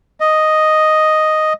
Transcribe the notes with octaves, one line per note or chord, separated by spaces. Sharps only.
D#5